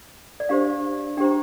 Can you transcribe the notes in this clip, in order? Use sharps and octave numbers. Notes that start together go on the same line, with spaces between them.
D5
D4 G4 C5 F5
D4 G4 C5 G5 A#5